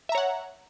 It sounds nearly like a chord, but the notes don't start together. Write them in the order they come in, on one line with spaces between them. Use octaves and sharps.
E5 A#5 C#5 F#5